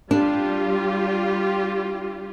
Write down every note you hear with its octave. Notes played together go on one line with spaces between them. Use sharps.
G3 D4 F4 G4